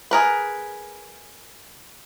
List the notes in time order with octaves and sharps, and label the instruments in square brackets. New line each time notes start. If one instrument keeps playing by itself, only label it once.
[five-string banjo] G#4 A#4 B4